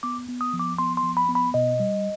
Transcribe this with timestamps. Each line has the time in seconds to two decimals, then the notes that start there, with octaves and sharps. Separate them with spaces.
0.03 B3 D6
0.28 B3
0.41 D#6
0.53 F3
0.60 D6
0.78 B3 C6
0.97 C6
1.03 F3
1.17 B5
1.29 B3
1.35 B5
1.54 B2 D#5
1.80 G3